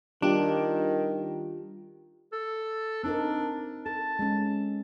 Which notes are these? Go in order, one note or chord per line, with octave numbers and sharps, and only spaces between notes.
D#3 G3 D4 F4 G4
A4
C4 D4 D#4 A#4
A4 A5
G#3 C#4